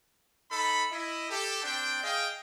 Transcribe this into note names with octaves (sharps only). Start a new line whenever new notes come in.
D#4 A4 B5
E4 D#5
G4 A4
C4 D4 G5
G#4 D#5 F5 G5